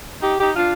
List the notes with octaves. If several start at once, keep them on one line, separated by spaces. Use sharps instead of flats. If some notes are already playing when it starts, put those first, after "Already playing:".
D#4 G4
D#4 G4
D4 F4